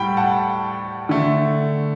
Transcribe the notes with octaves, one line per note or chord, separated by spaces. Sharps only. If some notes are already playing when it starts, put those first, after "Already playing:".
Already playing: A2 G3 F#5 G5 B5
F#5 A5
D3 A3